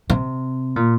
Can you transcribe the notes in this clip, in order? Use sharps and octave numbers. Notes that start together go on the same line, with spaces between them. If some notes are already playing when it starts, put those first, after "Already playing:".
C3
A#2